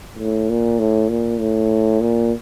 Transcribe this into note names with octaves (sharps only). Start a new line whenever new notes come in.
A2
A#2
A2
A#2
A2
A#2